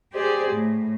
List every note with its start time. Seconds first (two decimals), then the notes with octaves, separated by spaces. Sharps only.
0.13 G4 G#4 C5 D5
0.52 A2